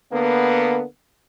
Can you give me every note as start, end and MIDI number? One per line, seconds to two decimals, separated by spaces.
0.12 0.84 50
0.12 0.84 58
0.12 0.84 59